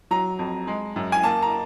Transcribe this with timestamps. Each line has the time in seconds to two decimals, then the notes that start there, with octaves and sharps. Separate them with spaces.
0.11 F#3 A#5
0.39 F2
0.67 G#3
0.96 F#2
1.12 G#5
1.23 A#3 A5
1.42 A#5